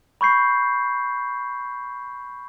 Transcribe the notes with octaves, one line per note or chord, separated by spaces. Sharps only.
B5 C#6 G6 C7